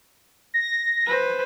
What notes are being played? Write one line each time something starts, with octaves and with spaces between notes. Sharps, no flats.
A#6
B4 C5